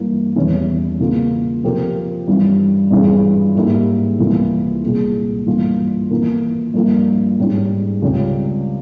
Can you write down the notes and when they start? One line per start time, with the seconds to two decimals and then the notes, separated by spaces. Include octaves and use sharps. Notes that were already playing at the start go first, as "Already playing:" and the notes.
Already playing: G2 E3 A#3
0.36 E2 E3 G3 C#4 E4
1.00 C#3 E3 A#3 F4
1.63 C3 F3 C4 G4 A#4
2.28 G2 E3 G3 C#4
2.91 G2 E3 G#3 C#4 F4
3.55 G#2 G3 A#3 E4 G4
4.19 C2 C3 E3 A#3 F4
4.82 C2 A#2 G#3 C4
5.46 G2 E3 A#3 F4
6.10 E3 A#3 F4 A#4
6.74 G2 F3 A#3 E4
7.38 G#2 G3 C#4 E4
8.02 C#2 C3 G3 C#4 G4